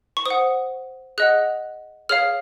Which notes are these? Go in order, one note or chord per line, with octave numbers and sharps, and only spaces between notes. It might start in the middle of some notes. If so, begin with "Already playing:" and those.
C#6
C5 F#5 D#6
G#4 D#5 F#5 F#6
G#4 C#5 F5 F6